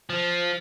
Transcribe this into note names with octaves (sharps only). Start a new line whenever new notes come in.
F3